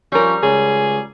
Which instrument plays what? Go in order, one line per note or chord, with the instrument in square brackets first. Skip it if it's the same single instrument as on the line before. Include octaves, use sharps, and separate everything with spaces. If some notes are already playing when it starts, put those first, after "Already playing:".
[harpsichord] F3 C#4 [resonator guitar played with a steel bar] G3 A#4
[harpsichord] C#2 [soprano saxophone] G#4